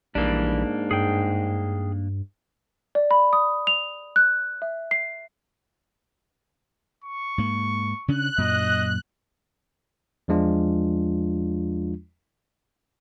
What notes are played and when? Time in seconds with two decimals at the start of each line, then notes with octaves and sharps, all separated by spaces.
0.15 A#1 G#2 E3 G3 A#3 D4
0.91 G2 G#4 G5
2.95 D5
3.11 B5
3.33 D#6
3.67 F7
4.16 F#6
4.62 E5
4.91 C7
7.04 C#6
7.38 G#2 A#3
8.08 C#3 C#4 D4 F#6
8.38 F#2 A#2 D#5
10.28 E2 F3 G#3 D4 F4